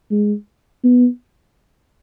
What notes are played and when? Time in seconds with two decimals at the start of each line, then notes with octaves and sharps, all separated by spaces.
0.11 G#3
0.84 B3